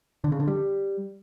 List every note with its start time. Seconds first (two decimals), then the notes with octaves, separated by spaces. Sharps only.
0.24 D3
0.32 C#3
0.40 D3
0.48 G3